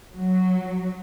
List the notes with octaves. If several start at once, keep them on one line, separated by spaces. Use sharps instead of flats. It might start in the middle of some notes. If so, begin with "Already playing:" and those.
F#3